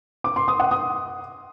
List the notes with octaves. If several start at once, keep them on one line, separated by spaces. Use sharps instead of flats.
D6
C6
D#6
F#5
D#6